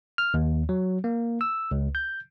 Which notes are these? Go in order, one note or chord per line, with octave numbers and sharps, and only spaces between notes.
F6
D#2
F#3
A#3
E6
C#2
G6